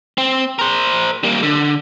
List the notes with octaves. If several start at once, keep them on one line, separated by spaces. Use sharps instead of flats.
C4
A#4 C5
G3 A#3
D3